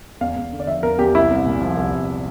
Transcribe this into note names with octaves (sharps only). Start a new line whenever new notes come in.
E2 F5
E2
D3
D5
F3 E5
E2 A#4
E2 G4
C2 E4
C2
A#2
F3
C2
C2